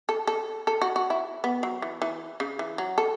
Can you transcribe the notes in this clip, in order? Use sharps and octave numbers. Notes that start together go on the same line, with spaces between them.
A4
A4
A4
F#4
F#4
E4
B3
F#3
E3
E3
C#3
E3
F#3
A4